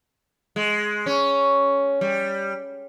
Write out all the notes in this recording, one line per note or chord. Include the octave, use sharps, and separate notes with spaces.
G#3
C#4
G3